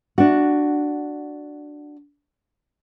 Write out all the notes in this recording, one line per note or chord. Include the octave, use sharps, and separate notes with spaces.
D4 F#4